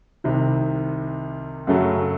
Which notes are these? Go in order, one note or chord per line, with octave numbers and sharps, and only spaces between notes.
C2 C3 D#3
F#2 C#3 F#3 A3